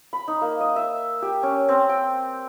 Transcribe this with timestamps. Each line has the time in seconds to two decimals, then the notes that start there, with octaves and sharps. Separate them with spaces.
0.13 B5
0.28 D#4
0.42 A#3
0.60 D#5
0.76 E5
1.22 G4
1.43 C#4
1.69 C4
1.89 G5